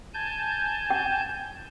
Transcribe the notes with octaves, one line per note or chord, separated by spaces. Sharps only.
G#5 A5 G6
G5